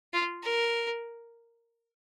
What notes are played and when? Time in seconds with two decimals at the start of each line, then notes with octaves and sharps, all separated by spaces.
0.13 F4
0.43 A#4